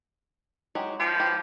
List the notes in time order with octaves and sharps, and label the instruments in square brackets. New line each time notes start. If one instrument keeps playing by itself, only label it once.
[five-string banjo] F#3 G#3 G4
[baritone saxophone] F3 [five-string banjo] G4
[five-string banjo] G4 B4